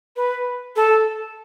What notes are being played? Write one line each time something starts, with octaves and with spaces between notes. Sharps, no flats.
B4
A4